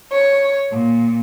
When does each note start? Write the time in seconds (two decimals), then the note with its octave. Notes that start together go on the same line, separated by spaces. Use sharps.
0.11 C#5
0.70 A#2